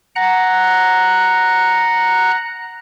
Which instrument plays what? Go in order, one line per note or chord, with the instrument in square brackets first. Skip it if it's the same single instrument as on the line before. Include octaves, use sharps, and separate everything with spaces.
[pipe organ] F#5 A#5 F#6